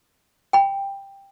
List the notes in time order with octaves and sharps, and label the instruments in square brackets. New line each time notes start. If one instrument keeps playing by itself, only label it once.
[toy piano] G5 B5